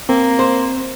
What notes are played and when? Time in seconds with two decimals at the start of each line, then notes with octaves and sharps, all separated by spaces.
0.09 A#3 C4
0.39 C5